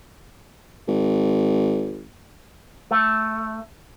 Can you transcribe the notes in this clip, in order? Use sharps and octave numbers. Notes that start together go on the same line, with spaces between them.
G#1
A3